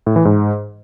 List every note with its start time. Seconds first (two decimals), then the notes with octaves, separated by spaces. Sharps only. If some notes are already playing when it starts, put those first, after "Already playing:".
0.06 A2
0.16 E3
0.25 G#2